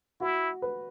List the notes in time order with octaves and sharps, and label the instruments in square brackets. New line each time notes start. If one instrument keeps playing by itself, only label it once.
[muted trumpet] E4 [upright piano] F#4
[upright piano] B4